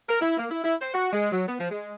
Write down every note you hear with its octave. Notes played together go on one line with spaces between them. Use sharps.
A#4
E4
A#3
E4
E4
C5
F#4
G#3
F#3
B3
F3
G#3